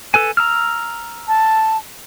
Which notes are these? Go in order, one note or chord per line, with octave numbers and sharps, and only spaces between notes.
A4 B4 G#5
A#5 E6 F6
A5